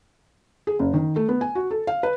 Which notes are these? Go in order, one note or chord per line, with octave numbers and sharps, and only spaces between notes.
G#4
F#1
D#3
A3
B3
G#5
F#4
A4
F5
B4